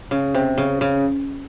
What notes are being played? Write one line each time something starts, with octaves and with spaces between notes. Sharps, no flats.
C#3
C3
C#3
C#3